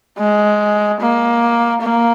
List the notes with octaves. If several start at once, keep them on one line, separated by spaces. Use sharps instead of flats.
G#3
A#3
A#3